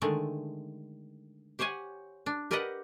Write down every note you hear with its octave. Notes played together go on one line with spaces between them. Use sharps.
D3 D#3 G#3 A3
G4 C5 C#5 F#5 G#5
D4
G4 A#4 B4 D5 D#5 F#5